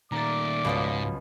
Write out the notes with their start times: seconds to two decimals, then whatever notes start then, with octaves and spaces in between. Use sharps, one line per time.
0.12 A#2 D#3 A3 D5 A#5 D6 A6
0.65 C#2 G#2 B2 F3 C#5